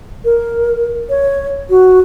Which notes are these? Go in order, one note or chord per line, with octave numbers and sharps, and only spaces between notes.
A#4
C#5
F#4